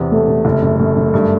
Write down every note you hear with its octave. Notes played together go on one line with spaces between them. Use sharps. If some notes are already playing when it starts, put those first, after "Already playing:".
Already playing: E2 C3
E1 A3
C3
F#1
F#2
F#2 A3
F#2
G2